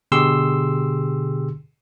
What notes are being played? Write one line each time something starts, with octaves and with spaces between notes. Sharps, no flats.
B2 D3 G4 G#4 C6 E6